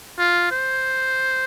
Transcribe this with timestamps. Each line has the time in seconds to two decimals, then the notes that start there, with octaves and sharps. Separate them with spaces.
0.18 F4
0.51 C5